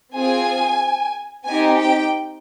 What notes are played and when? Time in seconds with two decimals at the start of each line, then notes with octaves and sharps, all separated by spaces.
0.13 C4 F4 G#4 G#5
1.45 C4 D#4 G4 G#5
1.78 G5